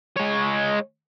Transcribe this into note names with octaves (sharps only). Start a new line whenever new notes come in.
G#3 C#5